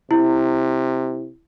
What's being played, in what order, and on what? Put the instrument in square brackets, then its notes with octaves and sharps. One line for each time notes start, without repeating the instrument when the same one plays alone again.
[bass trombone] C3 [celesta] E4